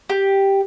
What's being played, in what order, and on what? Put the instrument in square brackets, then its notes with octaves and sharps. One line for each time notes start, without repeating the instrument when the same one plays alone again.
[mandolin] G4